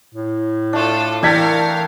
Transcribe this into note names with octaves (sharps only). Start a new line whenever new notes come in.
A2
A3 D4 F4 A4
E3 D4 A4 A#4 F5 G5 G#6 B6